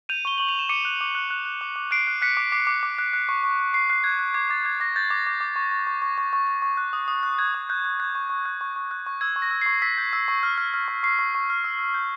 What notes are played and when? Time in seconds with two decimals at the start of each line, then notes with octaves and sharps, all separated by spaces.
0.09 G6 D#7 F7
0.25 C#6 G7
0.38 C#6 F#7
0.49 F7
0.55 C#6 E7
0.69 D6 C#7 D#7
0.85 F#6
1.01 D6
1.15 F#6
1.30 F#6
1.45 F#6
1.61 D6
1.76 D6
1.91 F#6 C7 D7
2.07 F#6
2.22 F#6 B6 C#7
2.37 D6
2.52 D6 C7
2.67 D6
2.83 D6
2.99 F#6
3.13 F#6
3.29 C#6
3.44 C#6
3.59 C#6
3.73 C#6 C7
3.90 F#6 C7
4.04 F#6 G#6
4.19 F#6
4.34 D6 G#6
4.50 D6 A6
4.65 D6 G#6
4.80 D6 A#6
4.96 G6 A6
5.11 D6
5.27 D6
5.41 D6
5.56 C#6
5.71 C#6
5.87 C#6
6.02 C#6
6.18 C#6
6.33 C#6
6.47 C#6
6.62 C#6
6.77 F#6
6.93 D#6
7.08 D#6
7.23 F#6
7.39 F#6 G#6
7.54 D#6
7.69 F#6 G6
7.85 F#6
7.99 F#6 G#6
8.15 C#6
8.30 C#6
8.46 F#6
8.61 C#6
8.76 C#6
8.91 F#6
9.06 C#6
9.21 E6 G#6
9.36 C#6
9.42 A#6
9.51 E6
9.61 C#6 C7
9.82 E6 B6
9.98 G6
10.13 E6
10.28 C#6
10.43 F6
10.58 F6
10.74 F6
10.88 C#6
11.03 C#6 C7
11.19 C#6
11.35 C#6
11.50 F6
11.64 E6
11.79 E6
11.94 G6